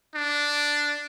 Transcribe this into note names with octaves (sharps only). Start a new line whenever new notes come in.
D4